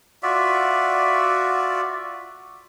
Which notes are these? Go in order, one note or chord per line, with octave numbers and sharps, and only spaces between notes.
F4 F#4 D5 E5